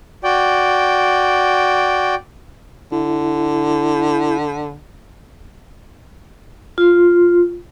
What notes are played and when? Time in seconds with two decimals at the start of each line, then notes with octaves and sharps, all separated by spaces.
0.24 F#4 D5 G5
2.92 D3 E4
6.78 F4